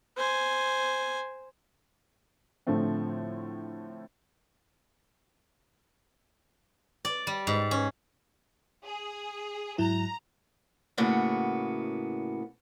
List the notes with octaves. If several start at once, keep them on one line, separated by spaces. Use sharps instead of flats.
C5 G#5
A2 D3 F3 A3 C4
D5
G3
G#2
C#4
G#4
G#2 F#3 E4 A#5
A2 C#3 A#3 B3 F#4